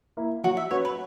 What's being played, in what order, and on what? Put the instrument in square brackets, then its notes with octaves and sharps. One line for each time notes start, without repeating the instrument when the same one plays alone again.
[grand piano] A#3 E4
[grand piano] F#3 [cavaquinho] F#4
[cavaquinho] E5
[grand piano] C#4 F#4 B4 [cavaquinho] C#5
[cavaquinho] B4